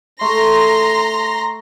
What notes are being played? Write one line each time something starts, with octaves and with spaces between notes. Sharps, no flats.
A3 A#5 C6 A#6